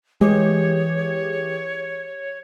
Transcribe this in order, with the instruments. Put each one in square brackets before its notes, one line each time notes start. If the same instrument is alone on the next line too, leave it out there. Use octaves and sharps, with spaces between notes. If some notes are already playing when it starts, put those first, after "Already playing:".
[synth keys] E3 G4 G#4 [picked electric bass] G#3 [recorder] C#5